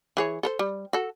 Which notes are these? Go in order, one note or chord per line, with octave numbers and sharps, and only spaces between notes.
E3 G#4 C#5
A4 A#4 C5
G3
F#4 A4